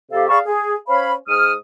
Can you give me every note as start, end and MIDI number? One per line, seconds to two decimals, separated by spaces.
0.12 0.26 41
0.12 0.26 48
0.12 0.26 67
0.12 0.26 69
0.12 0.26 77
0.29 0.40 68
0.29 0.40 74
0.29 0.40 77
0.29 0.40 81
0.29 0.40 83
0.29 0.40 85
0.46 0.74 68
0.88 1.13 61
0.88 1.13 72
0.88 1.13 73
0.88 1.13 77
0.88 1.13 83
1.28 1.53 44
1.28 1.53 87
1.28 1.53 89